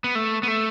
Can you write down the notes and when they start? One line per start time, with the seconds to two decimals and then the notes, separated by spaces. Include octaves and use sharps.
0.04 B3
0.15 A3
0.43 B3
0.48 A3